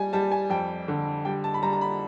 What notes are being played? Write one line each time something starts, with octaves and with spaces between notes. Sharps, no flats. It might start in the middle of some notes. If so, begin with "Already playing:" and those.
Already playing: G3 G#5
G3 A5
G#5
F2 G5
D3
G3 G5
A5
B5
G3 A#5
A#5
B5